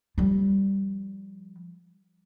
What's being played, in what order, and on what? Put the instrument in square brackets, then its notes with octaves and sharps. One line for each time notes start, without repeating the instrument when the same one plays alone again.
[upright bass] F3 G3